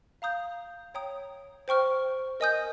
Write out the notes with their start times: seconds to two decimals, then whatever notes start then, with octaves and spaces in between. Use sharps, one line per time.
0.22 F5 A#5 D#6 G6
0.94 C#5 G5 A#5 D#6
1.68 C5 G5 C#6 F6
2.40 A#4 D#5 G#5 D#6 G6